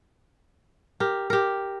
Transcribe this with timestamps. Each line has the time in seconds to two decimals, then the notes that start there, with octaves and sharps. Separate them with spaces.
1.00 G4 A#4
1.30 G4 A#4